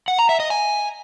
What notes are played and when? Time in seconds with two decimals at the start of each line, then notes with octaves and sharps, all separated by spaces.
0.08 F#5
0.19 A#5
0.29 E5
0.40 D#5
0.50 G#5